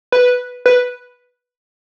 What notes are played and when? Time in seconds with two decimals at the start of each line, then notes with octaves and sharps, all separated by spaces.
0.12 B4
0.66 B4